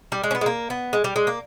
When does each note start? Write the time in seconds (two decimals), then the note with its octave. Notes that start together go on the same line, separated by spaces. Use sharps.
0.12 G3
0.23 G#3
0.31 C#4
0.35 B3
0.41 G#3
0.46 A#3
0.70 B3
0.93 G#3
1.04 G3
1.16 G#3
1.27 A#3